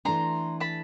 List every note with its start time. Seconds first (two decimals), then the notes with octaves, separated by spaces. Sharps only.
0.05 E3 A3 D4 A#5 C6
0.60 A5 B5